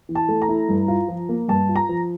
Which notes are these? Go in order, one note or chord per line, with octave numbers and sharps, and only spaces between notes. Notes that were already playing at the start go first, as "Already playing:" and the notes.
E3
A5
A3
A#5
E4
G2
F4
F3
A#3
G2 A5
F4
A#5
F3